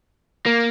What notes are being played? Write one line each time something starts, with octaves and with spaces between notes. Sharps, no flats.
A#3